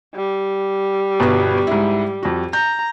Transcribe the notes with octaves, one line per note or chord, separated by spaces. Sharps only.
G3
G1 B2 B4
G#2 E4
F2 F#4
A#5 G6